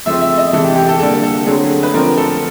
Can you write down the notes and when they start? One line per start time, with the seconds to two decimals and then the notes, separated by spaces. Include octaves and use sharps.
0.05 C#3 F3 A3 C4 E5
0.21 E5
0.37 D#5
0.53 C3 E3 G#3 A4
0.65 G4
0.76 G4
0.89 A4
0.99 D3 G3 A#3 A4
1.23 A4
1.46 D3 F#3 A3 C4 G#4
1.83 B4
1.93 D3 F3 A3 C4 A#4
2.17 A4